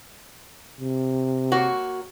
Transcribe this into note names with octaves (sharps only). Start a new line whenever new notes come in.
C3
A#3 F#4 C#5